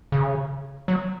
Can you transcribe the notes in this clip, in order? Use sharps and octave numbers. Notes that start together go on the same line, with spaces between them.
C#3
F#3